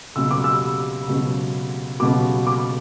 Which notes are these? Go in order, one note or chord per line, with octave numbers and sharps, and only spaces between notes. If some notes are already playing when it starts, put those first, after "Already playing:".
C#2 B2 F#3 E6
D6
E6
C#2 B2 F#3
C#2 B2 F#3 D6
D6